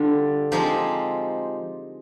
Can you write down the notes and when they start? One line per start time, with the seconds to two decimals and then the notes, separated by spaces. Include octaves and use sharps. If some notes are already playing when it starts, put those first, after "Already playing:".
Already playing: D3 G3 D4 F4
0.52 F3 G#3 C4 D#4 G4